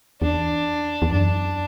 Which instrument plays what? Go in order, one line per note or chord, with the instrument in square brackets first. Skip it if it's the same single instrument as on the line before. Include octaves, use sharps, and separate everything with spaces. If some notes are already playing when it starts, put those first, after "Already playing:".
[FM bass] E2 [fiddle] D4
[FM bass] E2
[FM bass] F#2 [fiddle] D4